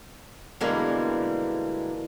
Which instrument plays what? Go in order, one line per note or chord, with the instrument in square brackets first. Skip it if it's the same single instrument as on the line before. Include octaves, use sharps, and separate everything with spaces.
[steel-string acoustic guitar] B2 D3 E3 G3 G#3 A#3